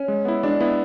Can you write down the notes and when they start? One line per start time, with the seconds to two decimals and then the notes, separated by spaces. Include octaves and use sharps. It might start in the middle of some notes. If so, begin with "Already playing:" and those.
Already playing: C#4
0.08 G#3
0.25 B3 E4
0.43 G#3 D4
0.61 B3 E4